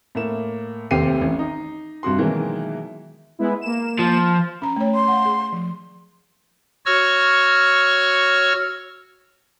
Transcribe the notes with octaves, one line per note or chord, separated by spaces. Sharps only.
A2 A#3 E7
F1 D#2 C4 G4 C7 D#7
A1
D#4
G2 C3 F#4 C6
B2 D#3 E3 F#3 G#3 A#3
G#3 B3 E4
A#3 E7
F3
C#4 A#5
A3 C#5
C6
F5 F#5
G#4
F3
F#4 C#5 C#6 E6 F6